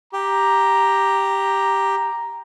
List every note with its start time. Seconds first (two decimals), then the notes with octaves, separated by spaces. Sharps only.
0.13 G4 A#5